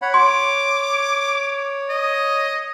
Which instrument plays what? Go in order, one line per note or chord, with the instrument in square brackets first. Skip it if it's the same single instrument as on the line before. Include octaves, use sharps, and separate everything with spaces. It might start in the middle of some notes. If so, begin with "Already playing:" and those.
[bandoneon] C#5 F#5 B5
[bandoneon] C#5 [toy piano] C6 [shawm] D6
[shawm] D#5